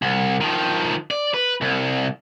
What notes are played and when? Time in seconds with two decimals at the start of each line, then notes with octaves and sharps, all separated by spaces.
0.02 C2
0.41 D#3 F3
1.11 D5
1.34 B4
1.61 C2